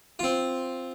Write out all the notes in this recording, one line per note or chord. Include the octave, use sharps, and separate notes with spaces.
C4 F4